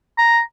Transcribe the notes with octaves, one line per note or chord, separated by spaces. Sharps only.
A#5